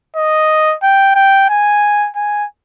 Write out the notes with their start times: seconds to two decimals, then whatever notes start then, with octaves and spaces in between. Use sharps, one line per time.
0.16 D#5
0.83 G5
1.15 G5
1.49 G#5
2.16 G#5